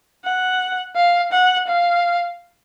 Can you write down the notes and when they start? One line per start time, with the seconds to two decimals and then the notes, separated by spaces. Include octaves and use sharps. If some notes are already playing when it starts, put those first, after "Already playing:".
0.25 F#5
0.96 F5
1.32 F#5
1.67 F5